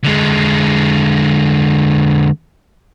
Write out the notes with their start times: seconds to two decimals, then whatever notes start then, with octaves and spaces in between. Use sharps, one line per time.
0.04 D3 G#3